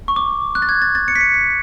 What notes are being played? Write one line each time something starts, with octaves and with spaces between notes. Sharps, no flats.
C#6
D6
F#6
A6
G#6
A6
A6
C#7
B6
C#7
B6